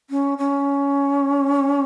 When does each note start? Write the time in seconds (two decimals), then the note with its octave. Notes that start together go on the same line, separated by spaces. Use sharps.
0.10 C#4
0.38 C#4